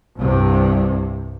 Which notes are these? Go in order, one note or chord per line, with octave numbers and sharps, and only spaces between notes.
C2 G2 C3